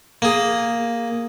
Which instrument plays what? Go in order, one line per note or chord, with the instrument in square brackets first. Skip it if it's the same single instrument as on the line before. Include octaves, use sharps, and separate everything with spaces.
[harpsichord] A#3 G#4